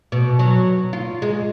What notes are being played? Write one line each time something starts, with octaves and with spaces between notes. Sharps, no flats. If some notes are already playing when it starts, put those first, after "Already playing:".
B2
F#3
F4
G#3